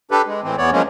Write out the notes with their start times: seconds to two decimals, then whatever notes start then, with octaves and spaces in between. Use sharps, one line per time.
0.11 D4 G4 A4 B4
0.26 G#3
0.43 A2 E3 C4
0.58 E2 E3 B3 C#5 D5
0.72 F3 F#3 G#3 A#3 C#4